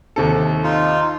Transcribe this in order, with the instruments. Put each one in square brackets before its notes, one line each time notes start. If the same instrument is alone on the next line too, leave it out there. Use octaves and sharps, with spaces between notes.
[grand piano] D#2 C3 A4
[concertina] D#4 F4